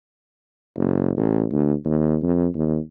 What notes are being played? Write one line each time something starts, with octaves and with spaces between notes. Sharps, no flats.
F#1
A1
D2
D#2
F2
D#2